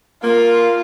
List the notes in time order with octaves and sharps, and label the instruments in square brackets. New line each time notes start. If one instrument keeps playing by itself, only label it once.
[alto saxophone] A#3 [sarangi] F4